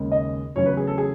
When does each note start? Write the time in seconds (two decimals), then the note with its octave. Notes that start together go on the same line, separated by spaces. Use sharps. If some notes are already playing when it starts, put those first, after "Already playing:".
Already playing: D#2 C#3 G#3 C#4
0.12 D#5
0.55 E2 C#3 F#3 A3 C#4 C#5
0.66 B4
0.77 G#4
0.87 A4
0.98 G#4